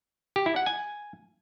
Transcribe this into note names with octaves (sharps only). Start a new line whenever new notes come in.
G4
E4
F#5
G#5